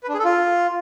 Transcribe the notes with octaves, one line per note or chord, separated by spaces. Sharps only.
B4
D4
G#4
A4
F4